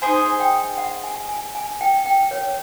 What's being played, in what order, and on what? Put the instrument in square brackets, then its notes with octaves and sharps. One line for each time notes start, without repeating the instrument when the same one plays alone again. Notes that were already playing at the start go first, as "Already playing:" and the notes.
[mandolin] D#4 G#4 C5 [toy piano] G#5
[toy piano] G5
F#5
G#5
G#5
G#5
G5
G5
C#5